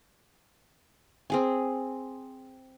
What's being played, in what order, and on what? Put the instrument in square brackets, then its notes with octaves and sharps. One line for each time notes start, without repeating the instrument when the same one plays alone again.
[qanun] C4 G#4 G#5